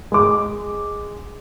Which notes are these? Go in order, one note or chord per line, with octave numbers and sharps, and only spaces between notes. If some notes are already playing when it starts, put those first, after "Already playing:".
G#3 D6